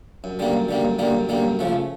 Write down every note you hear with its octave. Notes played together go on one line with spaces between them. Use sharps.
F#2
D3 G3 A#3
F#2
D3 G3 A#3
F#2
D3 G3 A#3
F#2
D3 G3 A#3
F#2
C#3 F3 A3